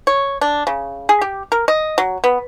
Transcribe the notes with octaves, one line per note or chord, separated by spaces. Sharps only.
C#5
D4
C#3
G#4
G4
A#4
D#5
F#3
B3